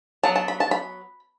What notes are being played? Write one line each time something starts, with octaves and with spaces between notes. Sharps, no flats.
F#3 B3 A5
A5
B5
A5
B5